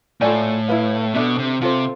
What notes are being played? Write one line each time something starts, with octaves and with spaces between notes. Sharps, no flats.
A2 F4 A4 D5 G#5
E4 B4 F5
B2 D4 A4 E5
C3
C3 F4 A4 C5